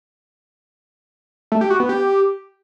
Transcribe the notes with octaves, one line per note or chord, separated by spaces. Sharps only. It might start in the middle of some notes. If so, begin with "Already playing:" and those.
A3
G4
F#4
B3
G4